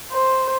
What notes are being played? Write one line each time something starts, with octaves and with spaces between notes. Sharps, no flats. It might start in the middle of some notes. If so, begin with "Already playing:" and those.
C5